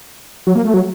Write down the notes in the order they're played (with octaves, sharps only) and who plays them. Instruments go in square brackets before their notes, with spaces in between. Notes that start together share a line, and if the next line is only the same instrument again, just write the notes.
[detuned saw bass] F#3
A#3
A3
F#3